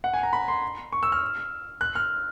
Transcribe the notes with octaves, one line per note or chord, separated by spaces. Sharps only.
F#5
G#5
A#5
B5
C6
C#6
E6
F6
F#6
F6